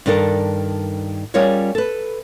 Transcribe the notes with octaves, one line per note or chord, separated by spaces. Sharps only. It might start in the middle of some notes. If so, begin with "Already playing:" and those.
G2 D#3 D4 A4 A#4
G3 C#4 F4 G#4 A#4 C#5
A4 B4